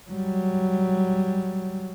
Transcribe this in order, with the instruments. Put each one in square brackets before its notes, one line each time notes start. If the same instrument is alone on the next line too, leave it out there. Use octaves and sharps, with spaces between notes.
[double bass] F#3 G3